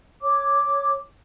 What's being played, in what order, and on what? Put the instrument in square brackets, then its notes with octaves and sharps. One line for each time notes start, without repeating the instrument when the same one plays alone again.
[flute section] C#5 D6